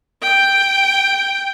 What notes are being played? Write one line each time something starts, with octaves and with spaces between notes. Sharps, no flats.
G5